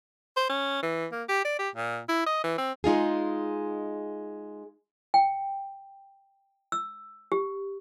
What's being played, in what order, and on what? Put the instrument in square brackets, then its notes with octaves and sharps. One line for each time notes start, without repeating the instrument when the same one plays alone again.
[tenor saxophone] C5
C#4
E3
A#3
G4
D5
G4
A#2
E4
D#5
E3
C4
[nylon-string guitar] G#3 D#4 F4 G#4
[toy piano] G5
E6
G4